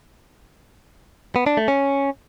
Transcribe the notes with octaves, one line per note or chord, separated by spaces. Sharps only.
B3
D4
A3
C#4